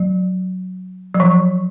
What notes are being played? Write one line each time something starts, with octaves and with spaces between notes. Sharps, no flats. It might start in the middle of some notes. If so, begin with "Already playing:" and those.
Already playing: F#3
F#3
F3